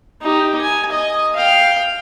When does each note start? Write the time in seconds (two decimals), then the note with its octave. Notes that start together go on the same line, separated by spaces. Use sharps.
0.22 D#4 G4
0.61 G#5
0.92 D#5
1.36 F5 G5